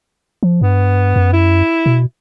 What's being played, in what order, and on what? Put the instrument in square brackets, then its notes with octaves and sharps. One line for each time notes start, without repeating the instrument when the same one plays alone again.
[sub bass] F3
[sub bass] G2 [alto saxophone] B3
[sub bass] F#2
[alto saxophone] E4
[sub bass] B2